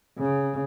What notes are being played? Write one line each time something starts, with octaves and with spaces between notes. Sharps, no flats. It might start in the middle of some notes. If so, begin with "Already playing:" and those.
C#3